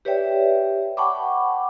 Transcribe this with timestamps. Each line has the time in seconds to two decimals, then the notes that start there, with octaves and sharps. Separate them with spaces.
0.05 G4 B4 C#5 D5 E5 G5
0.97 F#5 G5 A5 B5 C#6 D6